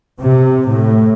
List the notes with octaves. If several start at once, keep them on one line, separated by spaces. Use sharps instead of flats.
C3
A2